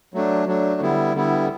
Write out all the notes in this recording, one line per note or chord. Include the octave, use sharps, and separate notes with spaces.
F#3 A3 D4
F#3 A3 D4
D3 G3 B3 E4
D3 G3 B3 E4